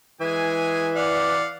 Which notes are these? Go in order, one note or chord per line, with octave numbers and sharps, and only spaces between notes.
E3 G#3 G#4 G#5
D5 F5 F#5